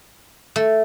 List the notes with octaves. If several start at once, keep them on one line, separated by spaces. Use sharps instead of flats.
A3